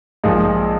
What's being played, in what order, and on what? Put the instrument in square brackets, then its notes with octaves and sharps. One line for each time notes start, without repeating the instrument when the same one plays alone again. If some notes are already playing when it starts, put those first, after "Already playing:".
[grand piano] A#1 A#2 F3 G#3 D#4